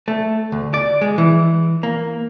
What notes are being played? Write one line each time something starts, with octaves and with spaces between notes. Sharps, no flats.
A3
D2
D5
G#3
E3
A#3